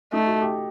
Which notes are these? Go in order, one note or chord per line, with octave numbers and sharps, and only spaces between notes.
A3 D#4
F#4
G4